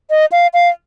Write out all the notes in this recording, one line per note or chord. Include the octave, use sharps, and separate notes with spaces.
D#5
F5
F5